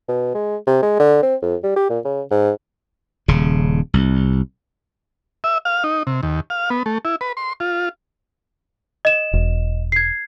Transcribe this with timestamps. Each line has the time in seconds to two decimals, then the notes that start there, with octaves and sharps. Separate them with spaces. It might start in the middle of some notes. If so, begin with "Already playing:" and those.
0.08 B2
0.34 G#3
0.67 C3
0.83 G#3
1.00 D3
1.23 C4
1.42 F2
1.63 G3
1.76 G4
1.90 A#2
2.05 C#3
2.31 G#2
3.28 D#1 C#3
3.94 C2
5.44 E5
5.65 F5
5.84 D#4
6.07 C3
6.23 D#2
6.50 F5
6.70 B3
6.86 A3
7.05 E4
7.21 B4
7.37 C6
7.60 F4
9.05 D#5 E7
9.33 E1
9.92 G#6 C7